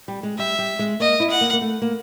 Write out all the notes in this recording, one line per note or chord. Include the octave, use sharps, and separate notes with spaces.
G3
G#3
G3 E5
G3
G#3
A#3 D#5
E4
F#5
A#3
A#3
A3
A#3